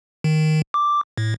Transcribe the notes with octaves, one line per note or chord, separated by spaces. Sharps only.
D#3
D6
A2